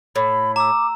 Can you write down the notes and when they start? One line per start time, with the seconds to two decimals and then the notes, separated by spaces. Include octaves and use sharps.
0.16 A2 B5
0.56 A#5 D6 E6